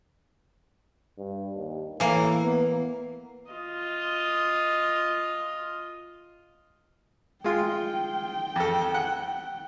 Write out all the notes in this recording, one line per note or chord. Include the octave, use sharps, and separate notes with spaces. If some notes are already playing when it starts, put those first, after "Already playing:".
G2
D#2
A2 E3 A#3
B3
F4 D#5
G#3 F4 G5
F2 A4
F#5 F#6